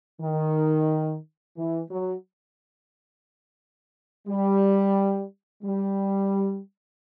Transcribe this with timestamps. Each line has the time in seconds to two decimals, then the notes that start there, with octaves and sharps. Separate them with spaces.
0.21 D#3
1.57 E3
1.91 F#3
4.28 G3
5.63 G3